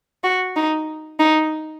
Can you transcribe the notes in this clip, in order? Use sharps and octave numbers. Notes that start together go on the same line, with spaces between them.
F#4
D#4
D#4